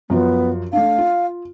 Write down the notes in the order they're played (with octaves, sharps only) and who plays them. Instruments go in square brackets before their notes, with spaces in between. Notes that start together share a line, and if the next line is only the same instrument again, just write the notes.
[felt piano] F#2 F3 F4 [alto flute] B3
[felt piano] A3 D4 [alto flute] F5
[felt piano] F4